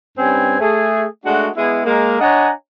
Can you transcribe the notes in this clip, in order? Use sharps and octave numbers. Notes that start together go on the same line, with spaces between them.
G2 G3 C4 C#4 G#5
A3 G#4
G#3 A3 D4 F#4
G#3 B3 E4 G#4
G#3 A#3 A#4
D4 C#5 D#5 F#5 G#5 A#5